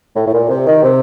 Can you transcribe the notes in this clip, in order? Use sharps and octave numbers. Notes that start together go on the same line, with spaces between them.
A2
A2
A#2
C3
D#3
C3